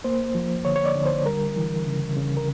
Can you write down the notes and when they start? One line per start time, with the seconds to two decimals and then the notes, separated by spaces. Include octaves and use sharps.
0.04 A#3 C5
0.35 F3
0.65 D3 C#5
0.76 C#5
0.86 D5
0.96 D3
1.06 C5
1.26 G3 A#4
1.56 E3
1.86 C#3
2.17 C#3
2.37 A#4